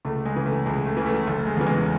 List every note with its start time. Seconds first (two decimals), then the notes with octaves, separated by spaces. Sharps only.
0.05 C#2 A3
0.25 G#3
0.35 C#3 E3
0.46 A3
0.66 C#2 G#3
0.86 A3
0.97 C#3 E3
1.06 A3
1.27 F#1 A3
1.47 G#3
1.57 E2 C#3 E3
1.66 G#3